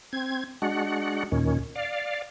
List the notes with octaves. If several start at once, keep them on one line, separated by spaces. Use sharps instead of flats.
C4 G#6
G#3 D4 F#4 F#5
D#2 A#2 D#3 C#4
D5 F5